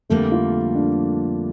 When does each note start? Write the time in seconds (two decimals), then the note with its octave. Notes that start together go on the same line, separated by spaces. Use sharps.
0.10 F2 D3 G3 A3 A#3
0.32 F4
0.75 D4